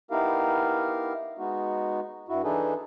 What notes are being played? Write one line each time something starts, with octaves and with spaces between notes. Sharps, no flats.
B3 D#4 E4 G4 A#4 F5
G#3 B3 D#4 F#4
G2 E4 F#4
E3 D4 D#4 G#4 A4 B4